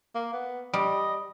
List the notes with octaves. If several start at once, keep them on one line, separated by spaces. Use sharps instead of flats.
A#3
B3
G3 D#5